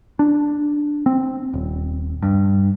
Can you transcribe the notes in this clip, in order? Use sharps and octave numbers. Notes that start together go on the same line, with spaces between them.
D4
C4
D#1
G2